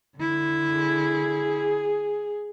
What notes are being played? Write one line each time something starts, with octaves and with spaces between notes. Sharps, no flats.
D3 E4
G#4